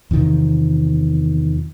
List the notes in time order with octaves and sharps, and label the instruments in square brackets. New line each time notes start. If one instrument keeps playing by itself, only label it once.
[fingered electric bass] E2 C3 D#3 F3